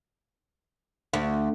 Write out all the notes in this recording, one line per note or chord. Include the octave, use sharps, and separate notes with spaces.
D2